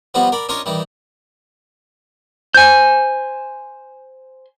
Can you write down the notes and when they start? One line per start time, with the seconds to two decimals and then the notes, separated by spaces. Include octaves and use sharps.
0.14 F3 G3 B3 F4 F#4
0.32 A#4 D5 B5
0.49 C#4 D4 F4 A#4 C#5 D#5
0.66 D#3 E3 G3
2.54 C5 G#5 G6